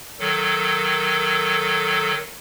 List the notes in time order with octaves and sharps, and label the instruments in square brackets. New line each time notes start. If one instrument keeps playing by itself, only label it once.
[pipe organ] D#3 F#3 A4